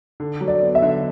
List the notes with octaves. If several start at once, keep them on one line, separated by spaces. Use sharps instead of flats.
D3
F#3
D5
B3
E5
D3